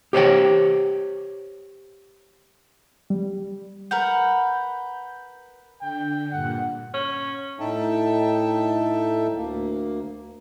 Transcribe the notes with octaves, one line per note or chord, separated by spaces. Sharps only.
G4 C5 C#5 G5
G3
A#4 B4 F#5 G6
D3 G5
G2 A#2 F#5
C#4
A2 D#4 A4 E5 G5 A5
D2 A#3